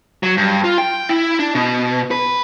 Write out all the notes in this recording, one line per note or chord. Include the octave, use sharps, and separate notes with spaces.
F#3
G2
F4
G5
E4
D4
B2
B4